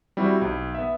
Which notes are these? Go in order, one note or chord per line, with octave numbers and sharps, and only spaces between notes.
G3 C4 E4 F#4
B1
B3 E5